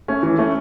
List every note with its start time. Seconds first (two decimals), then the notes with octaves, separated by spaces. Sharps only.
0.08 A3 C#4
0.23 E3
0.38 A3 C#4